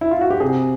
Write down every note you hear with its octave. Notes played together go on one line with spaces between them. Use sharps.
E4
F4
F#4
G4
C3 G#4